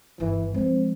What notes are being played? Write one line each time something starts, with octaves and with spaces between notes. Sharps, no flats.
G1 E3
F3 G#3 C4